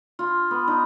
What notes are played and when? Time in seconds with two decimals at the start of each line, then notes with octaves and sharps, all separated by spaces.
0.19 F4
0.51 B3
0.68 D#4